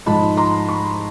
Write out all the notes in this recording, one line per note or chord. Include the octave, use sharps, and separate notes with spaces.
G#2 F3 G#3 A5 B5
A#5 C6
B5 C#6